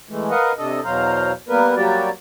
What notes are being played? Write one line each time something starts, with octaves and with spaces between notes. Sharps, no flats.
E3 G#3 A3
A#4 B4 D#5 F5 F#5
C3 D4 A4 D#5
E2 B2 F#3 C5 F5 A#5
G3 A#3 B3 A#4 B4
F#3 G3 A#3 F#4 G4 D5